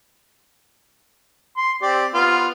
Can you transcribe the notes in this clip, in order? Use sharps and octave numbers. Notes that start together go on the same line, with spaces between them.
C6
C4 G4 D5
B3 F4